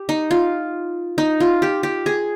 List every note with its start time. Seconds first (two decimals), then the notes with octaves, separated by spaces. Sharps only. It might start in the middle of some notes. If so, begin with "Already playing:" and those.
Already playing: G4
0.09 D#4
0.31 F4
1.18 D#4
1.40 F4
1.62 G4
1.83 G4
2.06 G#4